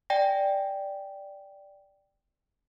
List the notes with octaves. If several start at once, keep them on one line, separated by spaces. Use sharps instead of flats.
D5 G5 G#5 A#6